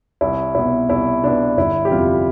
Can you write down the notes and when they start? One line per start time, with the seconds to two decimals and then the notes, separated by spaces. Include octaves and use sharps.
0.21 C2 E4
0.55 B2 B3 E4
0.89 C2 E4
1.24 B2 B3 D4
1.57 G1 E4
1.85 G4
1.91 F2 C3 G3 F4